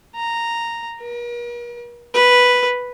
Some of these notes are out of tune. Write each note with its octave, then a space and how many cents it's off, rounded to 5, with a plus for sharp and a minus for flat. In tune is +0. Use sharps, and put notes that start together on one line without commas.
A#5 -5
A#4 +45
B4 +0